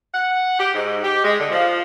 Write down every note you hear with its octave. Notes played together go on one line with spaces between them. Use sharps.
F#5
G4
G#2
G4
G#3
D3
F3